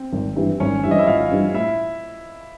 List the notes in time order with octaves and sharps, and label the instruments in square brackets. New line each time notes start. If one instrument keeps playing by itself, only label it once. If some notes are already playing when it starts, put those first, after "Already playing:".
Already playing: [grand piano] C4
[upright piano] G#1
G2 E3 G3
[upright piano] G#1 [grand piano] C#4 C#5
[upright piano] G2 E3 G3 [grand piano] E5
[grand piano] D#5
E4 E5
[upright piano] G#1 [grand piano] F4 F5
[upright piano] G2 E3 G3
[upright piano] A2 [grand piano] E4 E5